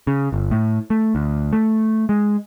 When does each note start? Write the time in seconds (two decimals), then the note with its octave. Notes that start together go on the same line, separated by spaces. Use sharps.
0.07 C#3
0.32 G1
0.51 A2
0.90 A3
1.15 D2
1.53 A3
2.09 G#3